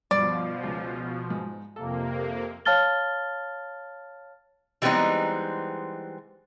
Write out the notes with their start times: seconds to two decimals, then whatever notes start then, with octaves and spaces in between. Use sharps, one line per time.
0.11 G2 B2 F3 D5
0.63 C#2
1.30 G#2
1.76 F2 C3 A#3 A4
2.65 C#5 F5 A5 F6 A6 G7
4.82 E3 G3 G#3 B3 C4 D#4